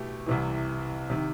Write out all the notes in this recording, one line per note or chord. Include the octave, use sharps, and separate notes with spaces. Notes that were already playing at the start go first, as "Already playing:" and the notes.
Already playing: B2 A3 E4 G4
C2 C3 E3
C3 D#3